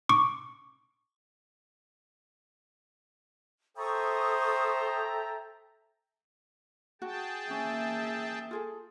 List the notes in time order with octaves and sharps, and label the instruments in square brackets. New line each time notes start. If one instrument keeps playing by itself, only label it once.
[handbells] C#6 D6
[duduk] A4 [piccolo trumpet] C5 [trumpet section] E5 G5 A#5 [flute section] C#6 D#6
[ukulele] F#4 [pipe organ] G#4 G5 A5
[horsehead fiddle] A#3 E5 [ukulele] C#4
[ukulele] F4 G#4 A4